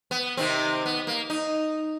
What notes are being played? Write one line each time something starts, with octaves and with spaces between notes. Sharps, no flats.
B3
C3 D#3 C4
B3
A#3
D#4